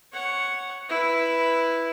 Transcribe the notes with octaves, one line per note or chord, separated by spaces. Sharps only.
C#5 F#5
E4 B4